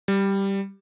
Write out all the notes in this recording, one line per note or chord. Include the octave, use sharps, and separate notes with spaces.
G3